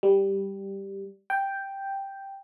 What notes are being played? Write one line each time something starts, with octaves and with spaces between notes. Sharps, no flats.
G3
G5